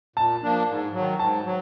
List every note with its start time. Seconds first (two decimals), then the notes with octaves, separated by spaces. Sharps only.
0.16 A#2 A5
0.43 F3 A#3 D4
0.68 G#2
0.93 F#3
0.99 D#3
1.20 G#2 A5
1.45 F#3